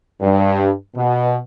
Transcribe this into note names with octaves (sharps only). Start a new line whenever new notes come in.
G2
B2